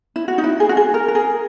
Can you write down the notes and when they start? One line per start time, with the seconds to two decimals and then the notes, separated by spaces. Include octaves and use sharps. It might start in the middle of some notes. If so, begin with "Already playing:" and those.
0.16 E4
0.28 F#4
0.38 D#4
0.44 E4
0.60 G#4
0.69 F#4
0.77 G#4
0.94 A#4
1.08 A#4
1.15 G#4